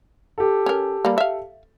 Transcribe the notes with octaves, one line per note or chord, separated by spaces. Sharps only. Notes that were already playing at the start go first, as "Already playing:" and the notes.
G4 A4
C#4 A#4
G3 A#3
E5 F5